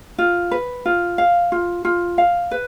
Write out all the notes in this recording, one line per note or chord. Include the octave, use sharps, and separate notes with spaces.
F4
B4
F4
F5
F4
F4
F5
B4